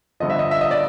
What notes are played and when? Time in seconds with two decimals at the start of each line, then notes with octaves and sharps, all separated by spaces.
0.20 G2 D3 F3 D#5
0.30 E5
0.39 D#5
0.51 E5
0.61 D#5
0.71 D5